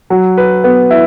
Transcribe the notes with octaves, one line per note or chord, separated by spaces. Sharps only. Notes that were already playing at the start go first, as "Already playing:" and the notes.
F#3
B4
B3
E4